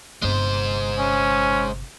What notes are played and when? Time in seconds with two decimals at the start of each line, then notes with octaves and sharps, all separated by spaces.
0.22 G1 C3 G#3 C5
1.00 C#4